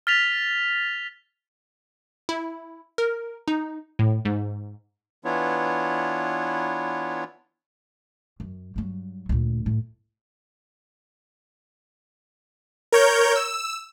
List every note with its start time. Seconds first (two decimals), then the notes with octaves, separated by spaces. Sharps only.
0.07 F6 A6 B6 F7
2.29 E4
2.98 A#4
3.48 D#4
3.99 A2
4.25 G#2
5.24 E3 B3 D4 E4 F4 C#5
8.40 F#2
8.76 G2 F#3
9.29 D2 A#2
9.66 A2
12.92 A#4 C#5 G6
13.36 E6